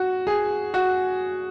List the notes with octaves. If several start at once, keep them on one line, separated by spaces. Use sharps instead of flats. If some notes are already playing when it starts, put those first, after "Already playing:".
Already playing: F#4
G#4
F#4